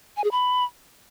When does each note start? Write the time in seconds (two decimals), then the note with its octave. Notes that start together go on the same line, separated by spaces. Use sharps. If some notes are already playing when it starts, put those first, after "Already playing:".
0.17 G#5
0.24 G#4
0.31 B5